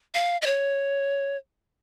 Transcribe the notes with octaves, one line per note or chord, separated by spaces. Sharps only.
F5
D#5
C#5